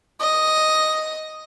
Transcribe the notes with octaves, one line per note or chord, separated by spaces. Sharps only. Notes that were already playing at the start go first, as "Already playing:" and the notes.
D#5